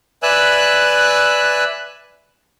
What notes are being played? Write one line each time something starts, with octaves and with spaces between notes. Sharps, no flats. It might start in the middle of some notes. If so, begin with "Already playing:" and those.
B4 D5 E5 G#5 E6 F#6